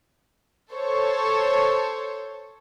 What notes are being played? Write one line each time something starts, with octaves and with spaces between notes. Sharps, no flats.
A4 C5 C#5